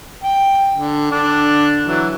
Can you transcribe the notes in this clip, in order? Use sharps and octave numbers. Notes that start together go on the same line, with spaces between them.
G5
D3
D3 D4
E3 F#3